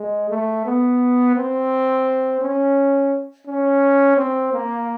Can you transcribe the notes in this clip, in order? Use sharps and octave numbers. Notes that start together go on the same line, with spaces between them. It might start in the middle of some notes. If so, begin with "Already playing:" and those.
Already playing: G#3
A3
B3
C4
C#4
C#4
C4
A#3